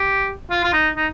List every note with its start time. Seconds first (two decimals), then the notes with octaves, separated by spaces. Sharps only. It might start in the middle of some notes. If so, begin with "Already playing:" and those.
Already playing: G4
0.51 F4
0.64 F4
0.73 D#4
0.96 D#4